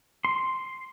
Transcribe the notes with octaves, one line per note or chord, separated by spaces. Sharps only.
C6